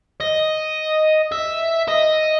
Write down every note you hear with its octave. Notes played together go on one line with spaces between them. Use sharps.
D#5
E5
D#5